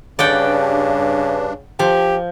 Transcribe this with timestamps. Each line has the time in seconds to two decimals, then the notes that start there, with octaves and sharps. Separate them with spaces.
0.19 G2 C#3 D4 D5 F#5 G5
1.79 F3 G4